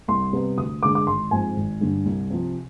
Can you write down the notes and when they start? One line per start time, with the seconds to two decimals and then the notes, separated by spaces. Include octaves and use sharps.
0.08 C2 C6
0.33 C3 G3 B3
0.58 D2 D#6
0.83 D3 G#3 D6
0.95 D6
1.07 G#1 C6
1.31 G#2 F3 C4 G#5
1.56 G#1
1.81 G2 D3
2.06 C2
2.30 C3 F3